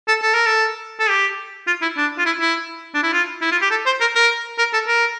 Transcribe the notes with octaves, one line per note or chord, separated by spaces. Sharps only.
A4
A4
A#4
A4
A4
G4
F4
E4
D4
F4
E4
E4
D4
E4
F4
E4
F4
G4
A4
C5
A#4
A#4
A#4
A4
A#4